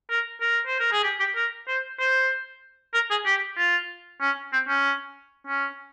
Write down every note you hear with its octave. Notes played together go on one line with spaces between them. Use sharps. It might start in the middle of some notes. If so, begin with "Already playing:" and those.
A#4
A#4
C5
A#4
G#4
G4
G4
A#4
C5
C5
A#4
G#4
G4
F4
C#4
C4
C#4
C#4